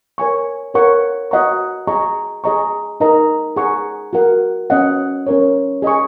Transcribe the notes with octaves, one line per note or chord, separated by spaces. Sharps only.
A#4 C#5 G#5 C#6
A#4 C#5 F#5 C#6
F#4 D#5 F#5 A#5 C#6
G#4 D#5 A#5 C#6
G#4 D#5 A#5 C#6
D#4 A#4 D#5 A#5
G#4 F#5 A#5 C#6
F#4 A#4 F#5
C#4 F#4 D#5 F#5
C#4 A#4 C#5
G#4 D#5 G#5 C#6